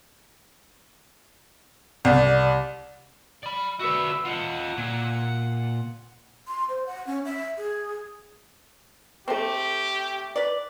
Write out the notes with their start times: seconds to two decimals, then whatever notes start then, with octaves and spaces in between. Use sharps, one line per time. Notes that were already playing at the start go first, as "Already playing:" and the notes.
2.05 C2 D5
3.43 D5 B5
3.80 F#4 B4 D5 E5
4.25 F4 D#5 F#5
4.77 A#2
6.47 C6
6.69 C5
6.86 F#5
7.07 C#4
7.25 E5
7.57 G#4
9.28 A3 C4 G4 A4 D6
10.36 B4 D5